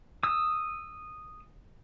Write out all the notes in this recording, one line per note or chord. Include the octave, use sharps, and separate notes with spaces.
D#6 E6